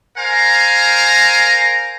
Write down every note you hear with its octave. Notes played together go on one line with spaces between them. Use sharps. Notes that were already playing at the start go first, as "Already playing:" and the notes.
A#4 C5 F5 G#5 A#5